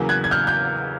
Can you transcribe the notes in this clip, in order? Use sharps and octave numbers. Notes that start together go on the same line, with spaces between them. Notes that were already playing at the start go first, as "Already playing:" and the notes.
Already playing: E2 C#3 F#3 A#3
F#6 G#6
G#6
F6 G6
G6